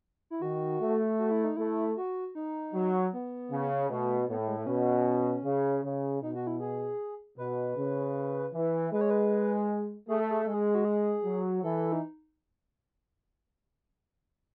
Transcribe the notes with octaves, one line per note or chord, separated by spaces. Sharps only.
E4
D#3 F#4
A3
F#4
E4
D#4
A3 E4
F#4
D#4
F#3
B3
C#3
B2 A3
A2 B3
A3
G#3
A3
B2 C#4
C#3
C#3
B2 D#4
F#4
E4
G#4
B2 B4
C#3
E3
G#3 B4
C#5
B4
A3 G#4
A4
G#4
G#3 A4
G#4
F#4
G#4
F#3
E3 A4
D#4